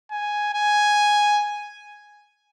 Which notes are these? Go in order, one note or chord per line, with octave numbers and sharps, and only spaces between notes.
G#5
G#5